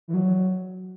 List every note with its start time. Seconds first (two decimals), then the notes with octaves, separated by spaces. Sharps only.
0.08 E3
0.14 F#3